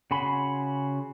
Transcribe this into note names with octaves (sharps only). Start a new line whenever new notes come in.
C#3 F#4 G#5 B5 C6